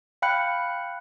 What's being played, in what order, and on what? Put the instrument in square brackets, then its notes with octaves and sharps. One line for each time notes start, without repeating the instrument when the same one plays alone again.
[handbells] F5 G5 B5 F#6 C#7